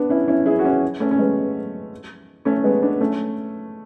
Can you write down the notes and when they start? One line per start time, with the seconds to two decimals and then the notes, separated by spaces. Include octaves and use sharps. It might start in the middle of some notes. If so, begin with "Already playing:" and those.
Already playing: B3 D4
0.10 C#4 E4
0.28 C#4 E4
0.46 E4 G#4
0.59 F#4
0.64 C#4 E4
1.00 A3 C#4
1.11 C#4
1.19 G#3 B3
2.45 A3 C#4
2.64 G#3 B3
2.82 B3 D4
3.00 A3 C#4